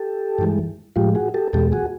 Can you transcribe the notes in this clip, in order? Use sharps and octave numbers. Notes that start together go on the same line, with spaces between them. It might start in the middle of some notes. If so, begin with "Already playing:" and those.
Already playing: G4 A4
G2 E3 G#3
A2 F3 G#3 F4 G4
F#4 G#4
G4 A4
E2 B2 G#3 G4 A4
F#4 G#4